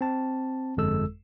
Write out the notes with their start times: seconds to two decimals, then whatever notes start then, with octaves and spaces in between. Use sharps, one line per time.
0.01 C4 A5
0.77 G1 F2 G#3 A4 E6